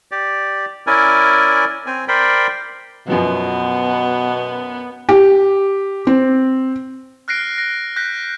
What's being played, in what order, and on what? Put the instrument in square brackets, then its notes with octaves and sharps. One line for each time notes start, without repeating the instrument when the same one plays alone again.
[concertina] G4 D5
C#4 E4 A#4 D5 G#5
C4 G#5
A#4 C5 D5 G5 B5
[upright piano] F#2 F3 F#3 [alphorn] B2 [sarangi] B3
[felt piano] G4
C4
[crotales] F6 F#6 A#6 C7 D7
A#6
F#6 G6 A#6 B6